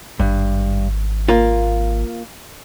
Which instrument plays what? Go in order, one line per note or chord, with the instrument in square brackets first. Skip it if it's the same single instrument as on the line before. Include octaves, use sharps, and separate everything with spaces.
[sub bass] G#1 [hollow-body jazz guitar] G2
[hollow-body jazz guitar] A#3 F4